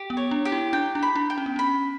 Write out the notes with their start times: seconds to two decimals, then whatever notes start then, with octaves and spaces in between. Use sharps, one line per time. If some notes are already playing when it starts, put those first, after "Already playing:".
Already playing: G4
0.10 B3
0.17 C#5
0.31 D4
0.45 G4
0.52 E4
0.73 D4 G5
0.95 D4
1.03 B5
1.16 D4
1.30 G5
1.38 C#4
1.46 B3
1.56 C#4 B5